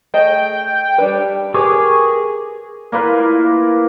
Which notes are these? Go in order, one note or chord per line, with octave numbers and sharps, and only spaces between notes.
A3 G#4 D#5 G5
G3 D4 B4
G4 G#4 A#4 B4 C#6 D6
A#3 E4 F4 B4